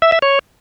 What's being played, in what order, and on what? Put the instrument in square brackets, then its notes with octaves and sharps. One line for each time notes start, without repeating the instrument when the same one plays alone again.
[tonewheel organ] E5
E5
C#5